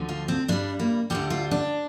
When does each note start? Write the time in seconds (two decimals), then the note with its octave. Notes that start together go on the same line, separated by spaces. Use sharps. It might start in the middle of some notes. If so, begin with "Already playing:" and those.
Already playing: D2 D3 F3
0.09 F4
0.28 C4
0.48 G2 G3 D4
0.79 A#3
1.10 D2 D3 G3 G4
1.30 F4
1.51 D4